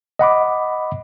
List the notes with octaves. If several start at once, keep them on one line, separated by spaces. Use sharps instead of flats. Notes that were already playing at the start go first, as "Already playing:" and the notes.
D#5 F#5 B5 D6